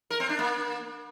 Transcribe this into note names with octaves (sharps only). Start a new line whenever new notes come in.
A#4
C4
D4
A#3